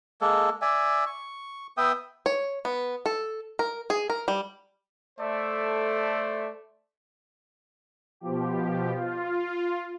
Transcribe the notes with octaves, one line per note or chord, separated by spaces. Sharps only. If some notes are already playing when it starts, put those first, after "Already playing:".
G#3 A#3 A4
D5 E5 G#5
C#6
B3 E5 G5 D#6
C#5
B3
A4
A#4
G#4
A#4
G3
A3 A4 C5 D5 E5
B2 F3 G4
F4